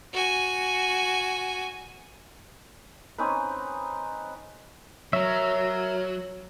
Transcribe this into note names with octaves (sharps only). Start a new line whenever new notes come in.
F#4 G#5
C4 C#4 D#4 B4
F#3 A#4 C#5 E5